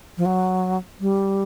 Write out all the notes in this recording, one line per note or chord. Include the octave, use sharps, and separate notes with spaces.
F3
F#3
G3